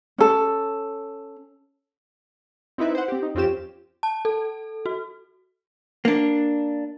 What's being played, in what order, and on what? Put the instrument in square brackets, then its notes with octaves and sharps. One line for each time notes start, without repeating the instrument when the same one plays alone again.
[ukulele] C#4 A4
[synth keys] C4 D#4 E4 B4 E5
C5 F#5
C4 G4
D#4
F2 C4 C#4 F4 G4 E7
[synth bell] A5
A4
F#4
[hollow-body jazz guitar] A#3 D4